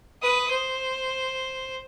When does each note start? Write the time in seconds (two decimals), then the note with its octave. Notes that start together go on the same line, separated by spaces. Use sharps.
0.21 B4 D#6
0.50 C5